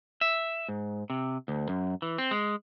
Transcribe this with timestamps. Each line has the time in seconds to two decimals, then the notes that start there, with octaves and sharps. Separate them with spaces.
0.21 E5
0.69 G#2
1.10 C3
1.48 D2
1.69 F#2
2.02 E3
2.18 C4
2.31 G#3